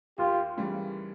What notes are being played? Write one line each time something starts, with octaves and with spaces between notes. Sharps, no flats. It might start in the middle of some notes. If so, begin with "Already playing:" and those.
D#2 F4 G4
C#3 E3 G3